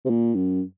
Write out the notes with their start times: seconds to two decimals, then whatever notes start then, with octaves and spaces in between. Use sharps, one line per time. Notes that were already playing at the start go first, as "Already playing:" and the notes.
0.05 C3
0.10 A#2
0.35 F#2